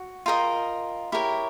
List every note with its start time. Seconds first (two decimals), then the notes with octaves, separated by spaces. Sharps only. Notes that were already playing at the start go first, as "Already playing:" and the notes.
Already playing: F#4
0.26 F4 A#4 D#5 F5 G5
1.12 E4 G4 A#4 C#5